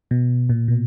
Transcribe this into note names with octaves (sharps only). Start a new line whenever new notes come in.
B2
A#2
B2